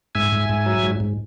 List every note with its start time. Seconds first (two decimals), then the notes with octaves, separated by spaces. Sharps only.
0.15 G#2 E5 G#5
0.32 G#2
0.49 G#2
0.66 F#3
0.83 G#2
1.00 G#2